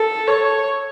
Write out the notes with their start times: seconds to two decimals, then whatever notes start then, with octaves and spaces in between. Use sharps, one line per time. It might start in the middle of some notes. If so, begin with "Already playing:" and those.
Already playing: A4
0.28 C#5